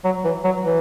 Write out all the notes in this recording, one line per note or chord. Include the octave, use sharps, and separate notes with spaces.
F#3
E3
F#3
E3